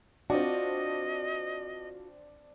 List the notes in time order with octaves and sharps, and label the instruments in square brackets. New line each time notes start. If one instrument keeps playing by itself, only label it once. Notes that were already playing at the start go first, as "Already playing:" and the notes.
[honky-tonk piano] C4 D4 [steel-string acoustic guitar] F4 F#4 [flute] D#5